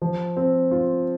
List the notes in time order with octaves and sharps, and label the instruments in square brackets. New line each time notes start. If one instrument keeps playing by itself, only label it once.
[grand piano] F3
C4
F4